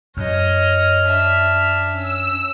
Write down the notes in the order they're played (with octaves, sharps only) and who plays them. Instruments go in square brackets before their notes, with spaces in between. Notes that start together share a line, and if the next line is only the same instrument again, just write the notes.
[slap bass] F#2 [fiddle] C#5 D#5 [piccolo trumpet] F6
[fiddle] D4 E5
[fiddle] C#4 [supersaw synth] E6